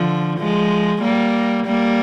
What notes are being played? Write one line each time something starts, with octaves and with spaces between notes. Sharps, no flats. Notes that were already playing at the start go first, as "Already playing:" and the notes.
Already playing: D3 F3
F3 G#3
G3 A#3
G3 A#3